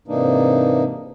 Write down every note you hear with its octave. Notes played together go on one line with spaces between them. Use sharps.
G#2 C3 E3 A#3 D4 D#4